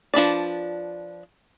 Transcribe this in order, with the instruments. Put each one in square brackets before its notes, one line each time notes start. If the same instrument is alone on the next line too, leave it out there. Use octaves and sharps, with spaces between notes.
[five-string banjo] F3 D4 B4 D5